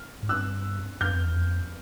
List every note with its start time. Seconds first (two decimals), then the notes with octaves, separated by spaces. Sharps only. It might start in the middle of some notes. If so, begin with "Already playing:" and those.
Already playing: F6
0.23 G#2
0.29 G2 E6 F#6
1.01 F#2 F6 G6
1.13 F2
1.25 E2
1.36 F2